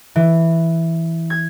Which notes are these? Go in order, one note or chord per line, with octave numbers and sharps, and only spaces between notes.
E3
G#6